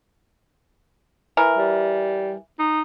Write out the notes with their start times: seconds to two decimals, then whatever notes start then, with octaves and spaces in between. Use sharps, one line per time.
1.37 E3 A#4
1.58 G3
2.59 D#4